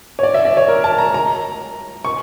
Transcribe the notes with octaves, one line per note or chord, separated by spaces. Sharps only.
C#5
D5
E5
D5
C#5
A#4
A5
A#5
A#5
C#6